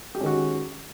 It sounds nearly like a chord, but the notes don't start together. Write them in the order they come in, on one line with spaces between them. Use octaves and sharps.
G4 G#3 C#4 D#3 F#4